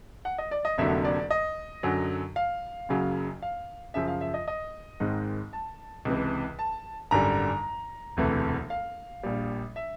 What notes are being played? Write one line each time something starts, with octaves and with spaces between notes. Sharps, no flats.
F#5
D#5
D5
D#5
F1 F2 D3 F#3 A#3 E5
D5
D#5
F#2 D3 F#3
F5
F#1 F#2 C#3 F#3
F5
F#2 C#3 F3 E5
F5
E5
D#5
D#5
G#1 G#2 D#3 G#3 C4
A5
C#2 C3 E3
A5
G#1 F#2 D3 G3 A#5
E1 D2 C3 E3 A3
F5
A#1 A#2 G3
E5